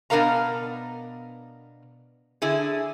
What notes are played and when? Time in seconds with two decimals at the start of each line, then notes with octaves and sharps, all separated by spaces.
0.10 B2 B3 D4 A#4 F5 A#5
2.42 D3 E4 G#4